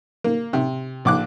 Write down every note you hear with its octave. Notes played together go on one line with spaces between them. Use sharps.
A#3
C3
A#1 D6 F#6